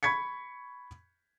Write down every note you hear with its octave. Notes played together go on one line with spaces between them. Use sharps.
B5 C#6 G#6 B6 C#7